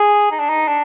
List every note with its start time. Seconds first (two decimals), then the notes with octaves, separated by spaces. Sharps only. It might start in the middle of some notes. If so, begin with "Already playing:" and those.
Already playing: G#4
0.31 D#4
0.39 D4
0.49 D#4
0.68 D4